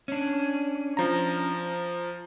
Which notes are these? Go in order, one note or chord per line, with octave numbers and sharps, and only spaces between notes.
C#4 D4
F3 A#5